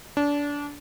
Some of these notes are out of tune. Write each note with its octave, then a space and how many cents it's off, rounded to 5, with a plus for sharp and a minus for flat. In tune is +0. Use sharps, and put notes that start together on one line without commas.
D4 -25